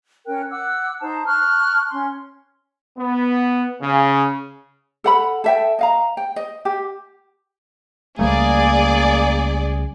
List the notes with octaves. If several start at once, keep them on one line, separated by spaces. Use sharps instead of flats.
C#4 A#4 G5 F#6
F#5 D6 E6 F#6
D#4 C5 A5 A#5
A5 C#6 F6 F#6
C#4 C6
B3
C#3
A4 F#5 B5
A4 E5 G5
D#5 F5 A#5
G5
D#5
G4
C#2 G3 A3 A#3 G#4 D5